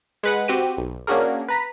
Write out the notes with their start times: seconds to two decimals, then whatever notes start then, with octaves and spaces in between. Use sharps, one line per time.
0.23 G#3 B4 F#5
0.48 C4 F#4 G4 D#7
0.77 B1
1.07 A#3 C#4 D4 F#4 G#4 A#4
1.48 B4 A#5 B6